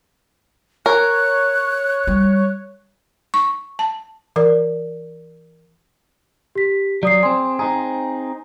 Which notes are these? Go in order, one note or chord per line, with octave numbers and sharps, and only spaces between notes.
A#4 C#5 F#6
G3
C#6
A5
E3 A#4 D5
G4 B6
F#3 D5 D#6 C7
C4 G#4 C6
C4 D#4 G#4 A#5